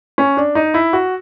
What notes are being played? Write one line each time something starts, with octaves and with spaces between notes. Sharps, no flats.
C#4
D4
D#4
E4
F#4